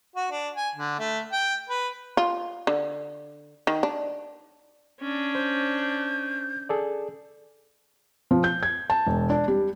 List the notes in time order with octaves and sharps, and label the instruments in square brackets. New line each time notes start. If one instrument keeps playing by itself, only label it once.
[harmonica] F#4
D4
G#5
D3
A3
G5
B4
[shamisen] F4
D3
D#3
D4
[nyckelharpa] C#4 D4
[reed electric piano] C5 [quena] G6
[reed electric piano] G#4 A4 D5
[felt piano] F3
G6
G#6
A5
E1
D4
G3